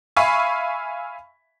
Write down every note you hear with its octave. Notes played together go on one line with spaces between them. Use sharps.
E5 F5 G#5 B5 C#6